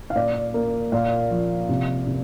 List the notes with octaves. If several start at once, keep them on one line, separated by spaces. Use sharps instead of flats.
F5
A#2 D5
A#3
A#2 F5
F3
C3
C3